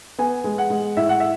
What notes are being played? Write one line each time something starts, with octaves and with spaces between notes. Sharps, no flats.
B3 G#5
G#3
F#5
G#3
A2 E5
F#5
E5